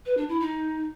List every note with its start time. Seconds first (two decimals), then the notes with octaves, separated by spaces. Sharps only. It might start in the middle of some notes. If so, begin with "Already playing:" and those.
0.06 B4
0.17 D4
0.29 E4
0.40 D#4